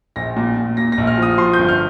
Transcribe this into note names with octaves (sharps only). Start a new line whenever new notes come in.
A#1 A#6
A#2
A#2
A#2 A#6
A#6
A#1
F6
F3
D#6
F3 C6
G6
G1
F6